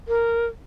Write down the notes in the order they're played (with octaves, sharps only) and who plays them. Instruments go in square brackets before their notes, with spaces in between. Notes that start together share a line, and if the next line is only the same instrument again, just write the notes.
[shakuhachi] A#4